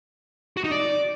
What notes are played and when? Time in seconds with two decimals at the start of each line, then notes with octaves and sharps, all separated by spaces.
0.57 F#4
0.64 D#4
0.71 D5